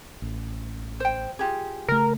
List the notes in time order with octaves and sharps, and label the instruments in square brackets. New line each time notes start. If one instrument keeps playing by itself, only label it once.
[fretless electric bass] A1
[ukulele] C5 G5
F4 G4 G#4
[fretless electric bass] C#3 A3 [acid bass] A#4